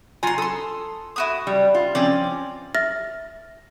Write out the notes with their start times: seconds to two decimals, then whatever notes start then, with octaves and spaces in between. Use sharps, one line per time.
0.23 F#3 F4 G#5 A#5 C6
0.38 A4 C6 D#6
1.16 E4 F#4 D#6
1.47 G3
1.75 F4
1.95 F3 C4 C#4 D5
2.75 E5 F6 A6 A#6